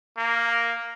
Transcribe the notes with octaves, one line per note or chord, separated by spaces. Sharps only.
A#3